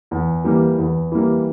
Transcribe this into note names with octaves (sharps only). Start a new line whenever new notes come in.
E2
E3 G3 A#3
E2
E3 G3 A#3